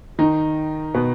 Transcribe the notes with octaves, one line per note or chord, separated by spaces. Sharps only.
D#3 D#4
B2 B3